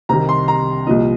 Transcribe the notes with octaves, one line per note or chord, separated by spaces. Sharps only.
C2 C3 D#3 G3 A#5
C6
A#5
C2 A#2 F3 D#5